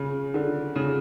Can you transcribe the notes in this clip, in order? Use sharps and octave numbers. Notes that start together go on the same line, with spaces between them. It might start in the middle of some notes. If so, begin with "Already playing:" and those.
Already playing: C#3
D3
C#3